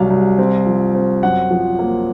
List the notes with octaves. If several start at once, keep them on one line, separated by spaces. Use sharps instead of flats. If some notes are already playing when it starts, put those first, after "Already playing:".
Already playing: C2 F#3 F5
C2
C4
F3
C4
F#2 F#5
F3
A#3